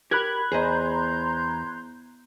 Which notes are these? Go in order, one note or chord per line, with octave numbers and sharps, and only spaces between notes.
G4 A#4 B5 F#6 G#6
E2 G#4 C5 D#5 A#5 C6 G6